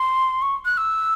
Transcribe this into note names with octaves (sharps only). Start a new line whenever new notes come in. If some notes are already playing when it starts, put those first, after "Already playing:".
Already playing: C6
C#6
F#6
E6